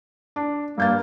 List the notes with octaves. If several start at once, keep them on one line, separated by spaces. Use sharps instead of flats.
D4
G2 A#3 G6 A6